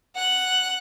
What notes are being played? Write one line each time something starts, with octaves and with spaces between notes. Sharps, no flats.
F#5 F#6